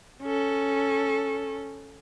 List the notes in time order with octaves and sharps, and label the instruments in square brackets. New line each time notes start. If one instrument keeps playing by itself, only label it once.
[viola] C#4 A4